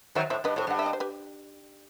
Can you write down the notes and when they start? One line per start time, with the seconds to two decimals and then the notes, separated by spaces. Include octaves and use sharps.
0.15 D#3 F#3 C5 E5
0.30 A2 C5 E5
0.44 G2 B4 D#5
0.56 A2 A4 C5
0.67 G2 F#5
0.79 E5
0.86 D#5
0.93 C5
1.00 G4 B4